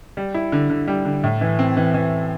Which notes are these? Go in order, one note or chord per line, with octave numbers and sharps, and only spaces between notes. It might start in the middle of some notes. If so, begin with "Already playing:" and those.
G3
E4
D3
D3
G3
D3
A2
E3
C4
E3
E3